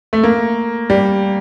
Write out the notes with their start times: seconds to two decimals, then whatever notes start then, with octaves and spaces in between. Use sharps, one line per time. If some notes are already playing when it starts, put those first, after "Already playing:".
0.13 A3
0.24 A#3
0.90 G3